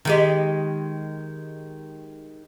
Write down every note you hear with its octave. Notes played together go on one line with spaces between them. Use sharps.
D#3 G#3 G4